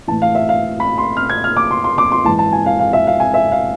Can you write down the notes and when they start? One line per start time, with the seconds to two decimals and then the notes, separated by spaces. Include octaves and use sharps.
0.08 A2 E3 A5
0.22 F5
0.35 E5
0.49 F5
0.80 B5
0.98 C6
1.17 F6
1.29 G#6
1.44 F6
1.57 D6
1.71 C6
1.84 C6
1.98 D6
2.12 C6
2.24 G#2 E3 A5
2.39 A5
2.53 G#5
2.66 F5
2.79 F5
2.93 E5
3.07 F5
3.20 G#5
3.34 E5
3.52 F5